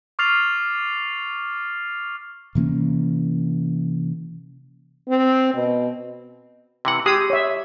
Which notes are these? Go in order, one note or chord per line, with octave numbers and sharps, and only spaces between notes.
C#6 D6 F6 A6 C7 F7
C3 E3 A#3 C#4
C4
B2
C3 E3 F#5
G#3 G4 G#4 D#6 E6
C#5 E5